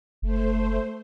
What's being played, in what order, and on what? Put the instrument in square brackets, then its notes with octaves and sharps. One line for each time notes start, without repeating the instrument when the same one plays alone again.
[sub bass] F#1 [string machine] A3 C5